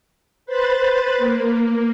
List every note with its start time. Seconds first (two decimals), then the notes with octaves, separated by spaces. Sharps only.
0.46 B4 C5 B5 F#6 A6
1.18 A#3